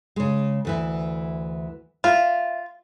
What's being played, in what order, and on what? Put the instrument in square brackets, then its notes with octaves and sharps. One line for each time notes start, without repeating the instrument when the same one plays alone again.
[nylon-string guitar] C#3 G#3
D2 E3 E4
[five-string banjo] F4 [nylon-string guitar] E5